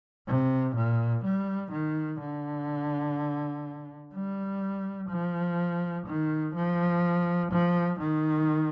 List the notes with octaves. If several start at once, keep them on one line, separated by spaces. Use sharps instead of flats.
C3
A#2
G3
D#3
D3
G3
F3
D#3
F3
F3
D#3